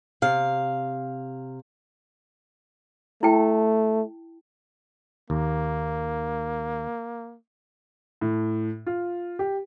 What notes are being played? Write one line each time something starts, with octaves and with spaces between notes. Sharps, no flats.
C3 F5
A3 E4 G5 A5
D#2 A#3
A2
F4
G4